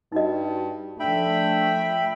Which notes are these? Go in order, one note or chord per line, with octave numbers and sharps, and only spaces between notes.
G2 D#4 F#4 D#5
F3 A3 D4 E5 G5 B5